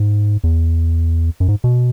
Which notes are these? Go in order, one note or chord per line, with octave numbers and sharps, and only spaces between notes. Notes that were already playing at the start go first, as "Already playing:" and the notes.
Already playing: G#2
E2
F#2
G#2
B2